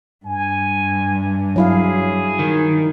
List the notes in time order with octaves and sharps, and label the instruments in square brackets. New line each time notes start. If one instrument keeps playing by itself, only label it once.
[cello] G2 [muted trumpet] G#5
[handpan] F#3 E4 F5 [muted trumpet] G#4
[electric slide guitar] D#3